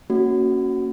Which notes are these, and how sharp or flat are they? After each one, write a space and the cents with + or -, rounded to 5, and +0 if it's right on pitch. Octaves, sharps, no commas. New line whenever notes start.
A#3 +0 C#4 +0 F#4 +0